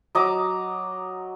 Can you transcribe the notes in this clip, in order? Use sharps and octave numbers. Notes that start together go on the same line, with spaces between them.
F#3 D#5 D6